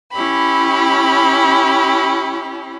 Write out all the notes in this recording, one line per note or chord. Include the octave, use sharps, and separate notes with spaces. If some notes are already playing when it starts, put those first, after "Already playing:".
C#4 E4 G4 B5